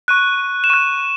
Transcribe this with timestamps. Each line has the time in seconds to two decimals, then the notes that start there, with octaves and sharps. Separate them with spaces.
0.08 C#6 F#6 D#7
0.64 E7
0.70 C#6 F#6 D#7